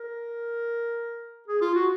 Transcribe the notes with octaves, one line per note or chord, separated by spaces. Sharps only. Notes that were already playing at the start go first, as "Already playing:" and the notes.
Already playing: A#4
G#4
F4
F#4